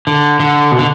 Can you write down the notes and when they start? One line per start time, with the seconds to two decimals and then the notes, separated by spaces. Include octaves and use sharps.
0.07 D3
0.40 D3
0.71 B2
0.79 D3